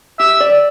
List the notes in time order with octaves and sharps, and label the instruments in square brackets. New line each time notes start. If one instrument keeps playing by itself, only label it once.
[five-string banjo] G4 [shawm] E5
[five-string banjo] D5